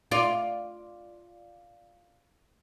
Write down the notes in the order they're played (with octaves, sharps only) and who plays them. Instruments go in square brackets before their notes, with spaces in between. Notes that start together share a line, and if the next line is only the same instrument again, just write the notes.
[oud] F4 D5